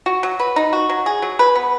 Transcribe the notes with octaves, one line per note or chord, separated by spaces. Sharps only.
F#4
F#3
B4
D#4
F#4
F#3
G#4
F#3
B4
B3